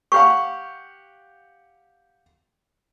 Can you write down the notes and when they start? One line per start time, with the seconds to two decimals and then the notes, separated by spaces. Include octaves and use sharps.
0.12 G4 F5 F#5 C#6